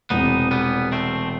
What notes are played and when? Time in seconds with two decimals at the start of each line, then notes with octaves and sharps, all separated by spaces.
0.10 E1 E2 C3 B3 D#4
0.51 G3 B3
0.92 A3 C4